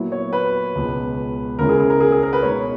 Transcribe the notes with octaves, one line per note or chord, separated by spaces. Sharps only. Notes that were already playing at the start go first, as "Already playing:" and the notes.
Already playing: A#2 F#3 B3 E4
C#5
B4
C#2 B2 G#3
C#2 C#3 G#3 C#4 E4 A#4
G#4
G#4
A#4
G#4
G#4
A#4
B4
B2 G#3 D#4 C#5